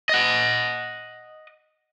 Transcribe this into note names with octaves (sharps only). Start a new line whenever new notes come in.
D#5 F#5